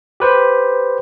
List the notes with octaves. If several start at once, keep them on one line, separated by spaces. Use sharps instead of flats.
G4 B4 C5